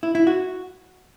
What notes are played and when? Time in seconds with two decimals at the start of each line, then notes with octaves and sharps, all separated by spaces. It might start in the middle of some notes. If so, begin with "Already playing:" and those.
0.03 E4
0.15 E4
0.27 F#4